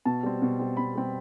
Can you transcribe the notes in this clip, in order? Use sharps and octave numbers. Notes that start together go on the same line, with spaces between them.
B2 A5
G3 C4
B2
G3 C4
B2 B5
G3 C4